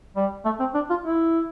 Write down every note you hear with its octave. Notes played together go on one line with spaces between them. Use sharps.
G3
A3
C4
D4
F4
E4